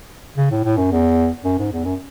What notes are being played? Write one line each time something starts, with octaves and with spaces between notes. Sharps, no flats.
C#3
A2
A2
F#2
E2
F#2
G#2
E2
F#2